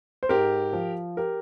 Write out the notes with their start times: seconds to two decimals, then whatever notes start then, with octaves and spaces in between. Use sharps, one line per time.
0.23 C5
0.29 G#2 G4 A#4
0.73 F3
1.17 G4 A#4